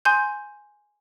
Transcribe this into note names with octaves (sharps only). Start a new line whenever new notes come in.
G#5 C6 D#6 G6